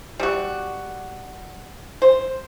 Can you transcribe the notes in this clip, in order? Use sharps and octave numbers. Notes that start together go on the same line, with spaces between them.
G3 F#4
C5